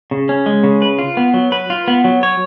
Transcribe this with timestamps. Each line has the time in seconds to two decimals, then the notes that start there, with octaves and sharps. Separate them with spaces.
0.11 C#3
0.29 C#4
0.46 G#3
0.64 C#3
0.82 B4
0.99 F4
1.17 B3
1.34 F#3
1.52 B4
1.70 F4
1.88 B3
2.04 F#3
2.23 C#5